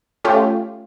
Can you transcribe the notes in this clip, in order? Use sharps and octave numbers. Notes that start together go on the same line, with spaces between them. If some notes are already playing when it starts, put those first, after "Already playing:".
A3 C#4 F4 G4